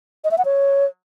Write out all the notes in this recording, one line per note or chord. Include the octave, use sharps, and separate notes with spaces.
D#5
E5
F#5
C#5